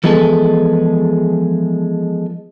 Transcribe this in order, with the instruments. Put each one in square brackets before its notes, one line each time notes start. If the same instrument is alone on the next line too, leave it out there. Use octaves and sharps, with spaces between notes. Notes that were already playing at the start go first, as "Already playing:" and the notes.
[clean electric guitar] E3 F3 G#3 B3 G#4 A4